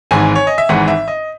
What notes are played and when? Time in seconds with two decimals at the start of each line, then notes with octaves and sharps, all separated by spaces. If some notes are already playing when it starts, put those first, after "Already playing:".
0.11 G#1 G#2 E3 G#5
0.35 C#5
0.47 D#5
0.58 E5
0.69 G#1 G#2 E3 F#5
0.88 E5
1.08 D#5